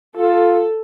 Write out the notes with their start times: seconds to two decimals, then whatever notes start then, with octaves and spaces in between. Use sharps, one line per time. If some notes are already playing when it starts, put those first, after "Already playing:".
0.17 F4 A4